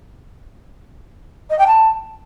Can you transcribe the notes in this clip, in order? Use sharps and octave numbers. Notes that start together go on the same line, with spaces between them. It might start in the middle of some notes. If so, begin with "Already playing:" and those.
D#5
G5
A5